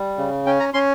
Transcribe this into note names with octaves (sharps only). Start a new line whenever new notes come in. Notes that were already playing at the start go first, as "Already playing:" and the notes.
Already playing: G3
C#3
C#4 G5
A#5
C#4 C6